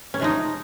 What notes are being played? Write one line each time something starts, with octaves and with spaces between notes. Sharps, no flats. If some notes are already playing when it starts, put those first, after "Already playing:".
C#4
C3 F3 G#3 D#4